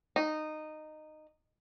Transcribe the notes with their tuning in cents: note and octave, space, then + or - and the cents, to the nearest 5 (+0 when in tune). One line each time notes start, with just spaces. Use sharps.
D#4 -15